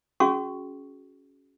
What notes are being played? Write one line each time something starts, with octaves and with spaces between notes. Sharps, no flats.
C#4 F#4 G#4 C#6